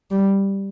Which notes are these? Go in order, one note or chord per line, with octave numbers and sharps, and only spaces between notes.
G3